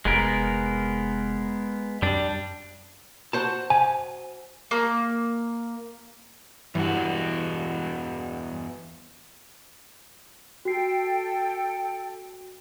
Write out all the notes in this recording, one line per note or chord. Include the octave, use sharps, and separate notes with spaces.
F1 G#3 B3 A#4
F#2 G3 D4
F#4 C5 A5
G#5
A#3
E2 G2 E3 F#4
F#4 A4 G5 C7